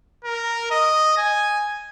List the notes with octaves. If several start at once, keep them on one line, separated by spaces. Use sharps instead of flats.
A#4
D#5
G#5